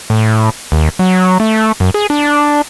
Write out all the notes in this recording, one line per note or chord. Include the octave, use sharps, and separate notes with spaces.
A2
D#2
F#3
A3
F#2
G#4
D4